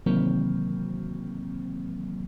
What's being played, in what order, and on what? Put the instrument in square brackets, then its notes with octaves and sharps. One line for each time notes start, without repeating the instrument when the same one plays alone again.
[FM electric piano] C3 D#3 E3 F#3 A#3 C4